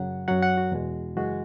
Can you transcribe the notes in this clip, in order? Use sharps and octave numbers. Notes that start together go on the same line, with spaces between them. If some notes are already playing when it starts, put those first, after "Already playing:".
Already playing: F#2 C#3 F#3 F#5
F#2 F#3 F#5
F#5
F#4
E2 B2 G#3
F#2 C#3 E3 G#3 F#4